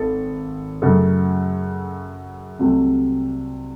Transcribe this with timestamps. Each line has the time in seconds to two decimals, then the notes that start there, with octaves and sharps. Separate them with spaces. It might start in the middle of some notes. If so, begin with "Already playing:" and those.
Already playing: G#1 A4
0.82 F#2 C#3 F#3 A3 A4
2.59 C2 C3 F#3 A3